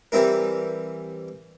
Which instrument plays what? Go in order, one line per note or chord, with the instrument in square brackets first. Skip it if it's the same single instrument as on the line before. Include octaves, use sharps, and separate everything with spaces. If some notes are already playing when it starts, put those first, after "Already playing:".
[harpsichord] E3 G3 C4 E4 A#4